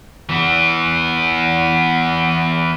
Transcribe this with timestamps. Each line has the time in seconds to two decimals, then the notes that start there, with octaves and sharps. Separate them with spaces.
0.29 E3 B3